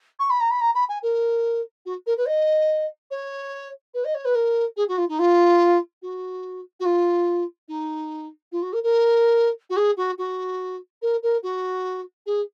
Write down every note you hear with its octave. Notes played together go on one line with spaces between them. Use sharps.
C#6
B5
A#5
B5
A#5
B5
G#5
A#4
F#4
A#4
B4
D#5
C#5
B4
D#5
C#5
B4
A#4
G#4
F#4
F4
D#4
F4
F#4
F#4
F4
D#4
F4
F#4
A#4
A#4
F#4
G#4
F#4
F#4
A#4
A#4
F#4
G#4